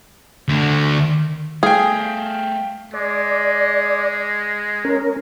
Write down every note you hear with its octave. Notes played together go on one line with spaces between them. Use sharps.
D2 D3
G3 A3 G#4 F5 G5
G#3 D5
C#4 A#4